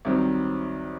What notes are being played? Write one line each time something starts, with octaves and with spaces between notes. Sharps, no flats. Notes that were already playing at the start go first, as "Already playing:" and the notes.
C2 C3 D#3 F#3